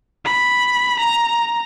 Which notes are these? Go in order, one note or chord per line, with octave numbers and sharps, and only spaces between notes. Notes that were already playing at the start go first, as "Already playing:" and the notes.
B5
A#5